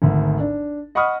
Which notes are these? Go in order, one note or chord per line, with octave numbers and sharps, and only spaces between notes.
G#1 D2
D4
D#5 F#5 B5 C#6 D#6 F6